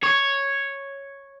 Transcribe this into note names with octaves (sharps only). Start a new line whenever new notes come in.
C#5